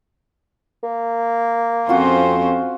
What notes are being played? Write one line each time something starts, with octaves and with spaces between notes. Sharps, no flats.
A#3
F2 C4 C#4 F4 F#4 C5